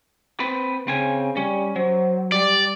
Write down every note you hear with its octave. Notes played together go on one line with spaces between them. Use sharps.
C4 B4
C#3 C4 G#5
G3 C#4
F#3 C5
G3 D5